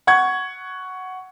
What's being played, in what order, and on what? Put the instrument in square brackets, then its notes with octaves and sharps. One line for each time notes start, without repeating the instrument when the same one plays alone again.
[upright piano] F#5 C#6 G#6